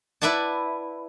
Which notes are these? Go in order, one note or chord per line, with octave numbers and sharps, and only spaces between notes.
E4 B4 D5 E5 F#5 A5